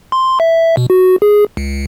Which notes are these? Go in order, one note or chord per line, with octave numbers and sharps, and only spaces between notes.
C6
E5
B2
F#4
G#4
C#2